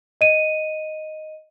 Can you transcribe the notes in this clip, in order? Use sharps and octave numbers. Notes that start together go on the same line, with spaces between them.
D#5 D#7